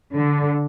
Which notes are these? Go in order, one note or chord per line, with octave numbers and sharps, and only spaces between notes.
D3